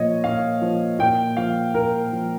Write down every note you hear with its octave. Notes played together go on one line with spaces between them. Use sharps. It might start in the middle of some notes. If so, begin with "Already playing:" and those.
Already playing: A#2 F3 C#5 D#5
A#2 F5
F3
A#2 G5
F3 F5
A#2 A#4
F3